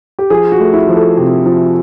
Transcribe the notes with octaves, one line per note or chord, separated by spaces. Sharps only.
G4
F3 G#4
F#4
A3
E4
F3
A4
C3
F3